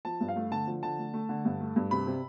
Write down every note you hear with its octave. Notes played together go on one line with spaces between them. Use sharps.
F3 A5
G2
F5
A3
D3 A5
F3
D3 A5
A3
A3
D3
G2
A3
G2
C3 B5
C3